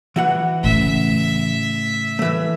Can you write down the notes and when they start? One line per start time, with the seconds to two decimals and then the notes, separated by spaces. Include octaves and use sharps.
0.16 E3 F#4 F#5
0.64 A2 C#3 E5
2.19 E3 A3